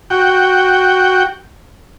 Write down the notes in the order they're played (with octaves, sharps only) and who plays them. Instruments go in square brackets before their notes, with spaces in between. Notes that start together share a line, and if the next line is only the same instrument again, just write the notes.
[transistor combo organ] F#4 G5